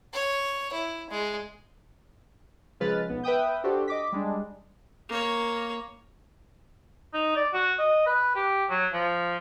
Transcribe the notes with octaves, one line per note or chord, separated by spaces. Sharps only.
C#5
E4
G#3
C#3 F3 G#3 B4 F6 A6
B1 B3
B4 E5 G5 D#6 G6
D4 F#4 G4 A4 C5
D#5 D6 B6
G3 G#3 D4
A#3 C#5
D#4
D5
F#4
D#5
B4
G4
F#3
F3